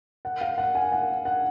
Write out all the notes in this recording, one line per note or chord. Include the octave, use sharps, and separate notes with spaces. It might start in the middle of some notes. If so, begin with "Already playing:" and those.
F#5
F5
F#5
G#5
F#5
F#5